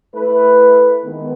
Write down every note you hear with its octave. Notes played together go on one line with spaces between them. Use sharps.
A3 E4 B4
D#3 G#3 B3